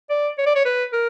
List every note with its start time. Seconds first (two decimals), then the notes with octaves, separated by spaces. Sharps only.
0.10 D5
0.38 C#5
0.46 D5
0.56 C#5
0.65 B4
0.93 A#4